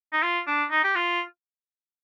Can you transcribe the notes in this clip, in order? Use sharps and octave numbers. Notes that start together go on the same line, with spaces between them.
D#4
F4
D4
D#4
G4
F4